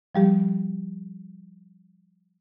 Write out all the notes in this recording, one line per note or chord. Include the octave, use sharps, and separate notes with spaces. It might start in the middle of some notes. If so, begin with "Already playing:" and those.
F3 G3 G4